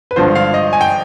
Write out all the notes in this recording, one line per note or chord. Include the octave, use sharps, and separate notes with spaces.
B4
G#1 G2 D3 F3 C5
F5
D#5
G#5
G5